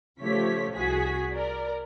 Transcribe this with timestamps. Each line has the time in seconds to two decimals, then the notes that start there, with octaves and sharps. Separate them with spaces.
0.19 C#3 F3 A3 G4 C#5 B6
0.75 C2 F#4 G#4 B6
1.32 A#4 D5